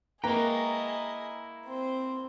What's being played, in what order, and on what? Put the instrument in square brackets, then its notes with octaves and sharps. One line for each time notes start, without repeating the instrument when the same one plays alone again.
[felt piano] A#3 B4 [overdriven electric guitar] E4 G5 [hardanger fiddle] G#4 D#5 [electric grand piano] A#5
[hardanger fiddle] C4 C5